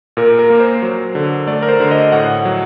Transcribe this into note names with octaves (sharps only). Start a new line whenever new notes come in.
A#2 A#4
A#4
A#3
C5
F#3
D3
A3 D5
A#4
C5
D3
D#5
A2 F#5
F#3